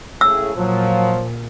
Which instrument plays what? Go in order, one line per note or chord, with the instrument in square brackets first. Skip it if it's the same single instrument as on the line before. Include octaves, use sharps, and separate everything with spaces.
[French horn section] A2 C#3 G#4 [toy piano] E6
[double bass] A#2 [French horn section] F3 [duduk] F#3